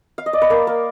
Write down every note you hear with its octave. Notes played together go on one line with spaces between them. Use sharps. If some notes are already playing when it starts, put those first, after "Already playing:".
F5
D#5
D5
B4
A#3 A#4
A#3